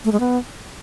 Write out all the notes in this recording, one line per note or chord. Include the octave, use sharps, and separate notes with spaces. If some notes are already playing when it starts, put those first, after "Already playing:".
A3
G#3
B3